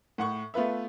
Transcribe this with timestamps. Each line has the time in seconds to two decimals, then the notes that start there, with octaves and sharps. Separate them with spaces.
0.18 A2 F#5 C#6
0.54 A3 B3 F4 B4 E5